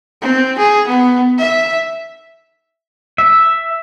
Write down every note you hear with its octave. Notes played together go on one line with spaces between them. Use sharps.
C4
G#4
B3
E5
E5